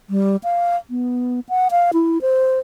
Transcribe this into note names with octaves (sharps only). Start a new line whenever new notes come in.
G3
F5
B3
F#5
F5
E4
C5